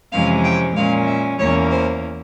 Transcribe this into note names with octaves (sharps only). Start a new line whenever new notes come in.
F2 C3 E3 G#3 C#4 F5
G5
A#2 G#3 C#4 F5
E5
E2 E3 A#3 C#4 C#5
C5